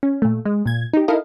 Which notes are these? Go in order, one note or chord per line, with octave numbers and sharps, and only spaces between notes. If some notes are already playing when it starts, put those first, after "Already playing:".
C#4
A#2 A3
G#3
A#2 G#6
D#4 G4
D#4 E4 A4 A#4 D#5 F5